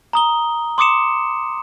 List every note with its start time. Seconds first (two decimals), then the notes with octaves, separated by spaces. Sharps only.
0.13 A#5 D#6 G7
0.78 C6 D6 D#6 C#7 E7